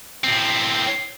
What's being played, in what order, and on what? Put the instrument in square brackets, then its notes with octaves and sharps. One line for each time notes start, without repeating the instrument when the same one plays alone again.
[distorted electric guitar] A2 C4